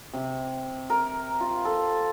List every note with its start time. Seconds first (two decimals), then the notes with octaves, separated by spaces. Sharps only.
0.14 C3
0.90 A#4
1.40 F4
1.65 A4